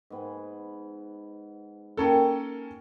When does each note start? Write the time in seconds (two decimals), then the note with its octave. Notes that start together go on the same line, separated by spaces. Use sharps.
0.10 G#2 B3 G#5
1.97 A#3 C#4 A4 A#4 G5